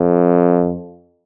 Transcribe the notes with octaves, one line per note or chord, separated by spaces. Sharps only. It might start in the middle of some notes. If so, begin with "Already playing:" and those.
Already playing: F2